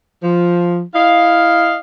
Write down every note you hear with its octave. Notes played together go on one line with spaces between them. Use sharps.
F3
E4 D#5 F5